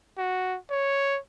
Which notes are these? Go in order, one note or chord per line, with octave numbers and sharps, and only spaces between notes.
F#4
C#5